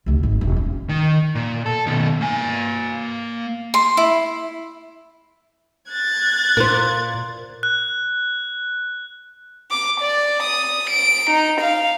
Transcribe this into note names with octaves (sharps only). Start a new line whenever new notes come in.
F1 D2
G#1
E1
C#4
D#3
A#2
A4
B2 D#3
A#3 G#5
C6
E4
F#6 G#6 A6
A#2 A#4 C5
F#6
D6
D5
D#6
D7
D#4
F5